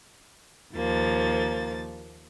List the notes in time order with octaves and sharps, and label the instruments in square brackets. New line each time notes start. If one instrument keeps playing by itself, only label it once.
[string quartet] D#2 F3 A#3 A6